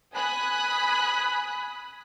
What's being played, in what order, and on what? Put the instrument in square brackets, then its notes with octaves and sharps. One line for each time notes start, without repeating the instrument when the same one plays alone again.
[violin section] G#5 B5 D#6 F#6